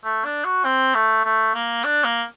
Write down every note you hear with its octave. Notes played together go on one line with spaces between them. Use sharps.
A3
D4
F#4
C4
A3
A3
A#3
D4
A#3